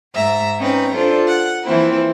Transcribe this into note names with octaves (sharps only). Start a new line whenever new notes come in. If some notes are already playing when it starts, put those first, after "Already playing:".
G#2 E5 A#5
C4 C#4 D#4 B4 A#5
D4 F4 A4 C5
F#5
E3 F3 A#3 C4 E4